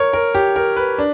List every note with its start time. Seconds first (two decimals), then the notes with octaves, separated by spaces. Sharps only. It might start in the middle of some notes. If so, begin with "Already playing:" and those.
Already playing: A#4 C#5
0.13 A#4
0.35 G4
0.56 A#4
0.77 B4
0.99 D4